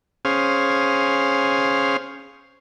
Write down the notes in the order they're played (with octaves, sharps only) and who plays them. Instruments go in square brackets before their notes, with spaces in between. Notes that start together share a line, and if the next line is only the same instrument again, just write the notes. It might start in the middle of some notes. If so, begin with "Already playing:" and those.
[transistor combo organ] C#4 G#4 C5 F5